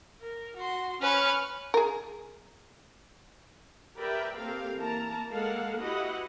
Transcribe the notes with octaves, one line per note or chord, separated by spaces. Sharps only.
A#4
F#4 C6
C#4 B4 C#6 F6
G#4 A#4
G4 A#4 B4 D5 E5 G5
A#3 C4 G4 A4 A#4 F5
E3 A#3 A#4 A5 A#5
G#3 A#3 A4 A#4 F5 F#5
E4 F#4 G4 B4 D#5 F#5